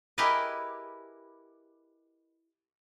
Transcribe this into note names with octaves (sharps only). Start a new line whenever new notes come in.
E4 G4 G#4 A#4 B4 D#5